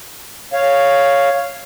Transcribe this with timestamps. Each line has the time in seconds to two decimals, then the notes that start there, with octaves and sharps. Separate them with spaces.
0.53 C#5 F5